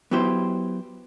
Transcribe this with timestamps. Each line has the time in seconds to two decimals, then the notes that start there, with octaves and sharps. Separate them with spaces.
0.11 F#3 B3 E4 G4 C5